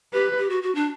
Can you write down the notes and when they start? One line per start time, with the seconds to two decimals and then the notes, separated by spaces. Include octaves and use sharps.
0.13 G4 B4
0.38 G4
0.50 F#4
0.63 F#4
0.75 D4